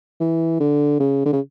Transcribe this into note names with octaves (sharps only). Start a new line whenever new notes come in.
E3
D3
C#3
D3
C#3